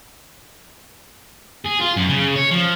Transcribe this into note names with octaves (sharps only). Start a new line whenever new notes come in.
G#4
F4
F#2
C#3
C#5
F3